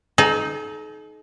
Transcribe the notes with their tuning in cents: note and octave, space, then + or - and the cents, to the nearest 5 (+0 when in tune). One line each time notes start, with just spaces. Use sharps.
D#4 +0 A4 -45